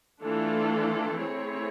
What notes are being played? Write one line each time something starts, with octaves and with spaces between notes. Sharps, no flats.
E3 A3 D4 F4 A4
A3 C4 E4 G#4 C#5